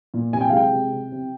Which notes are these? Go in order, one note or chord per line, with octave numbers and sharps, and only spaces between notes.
A#2
C3 G#5
G5
F5
G#3 G5
C3
C3
C3